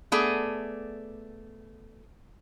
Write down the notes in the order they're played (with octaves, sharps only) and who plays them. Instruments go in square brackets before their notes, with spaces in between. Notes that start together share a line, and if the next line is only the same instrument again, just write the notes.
[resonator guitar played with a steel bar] A3 B3 G#4 D5